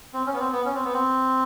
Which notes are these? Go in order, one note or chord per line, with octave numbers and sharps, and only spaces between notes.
C4
C#4
B3
C4
B3
C#4
C4
B3
C4